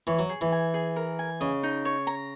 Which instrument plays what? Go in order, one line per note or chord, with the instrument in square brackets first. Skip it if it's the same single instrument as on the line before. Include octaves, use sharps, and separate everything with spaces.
[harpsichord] E3 [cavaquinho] C#5
[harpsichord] F#3
[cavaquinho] G#4
[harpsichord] E3
[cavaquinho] G#5
G#4
A#4
G#5
[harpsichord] C#3 [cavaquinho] D#5
[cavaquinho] D#4
C#5
A#5